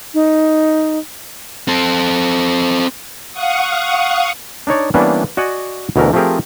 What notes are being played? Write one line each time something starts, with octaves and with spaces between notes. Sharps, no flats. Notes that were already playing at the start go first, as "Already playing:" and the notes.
D#4
C4 A4
F5 F#5 C#6 D#6
D4 D#4 C#5 D5
E3 G3 A#3 B3 C#4 D4
F#4 D5 D#5 F#5 G#5
D2 B2 E3 A3 A#4
F3 A3 C4 G4 G#4 A#4